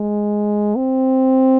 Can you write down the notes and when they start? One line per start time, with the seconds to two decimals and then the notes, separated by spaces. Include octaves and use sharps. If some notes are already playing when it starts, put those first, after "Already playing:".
Already playing: G#3
0.76 C4